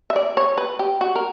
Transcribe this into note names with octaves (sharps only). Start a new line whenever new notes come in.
E5
D5
C#5
B4
G4
F#4
A#4